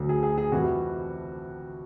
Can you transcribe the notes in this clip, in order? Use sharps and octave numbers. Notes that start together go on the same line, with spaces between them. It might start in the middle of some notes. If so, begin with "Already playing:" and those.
Already playing: D2 D3 F#3
G#4
G#4
G#4
F2 C3 E3 G3 F#4